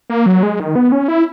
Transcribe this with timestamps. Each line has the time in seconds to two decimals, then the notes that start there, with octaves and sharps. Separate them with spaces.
0.10 A#3
0.26 F#3
0.43 G#3
0.60 D#3
0.76 B3
0.92 C#4
1.08 E4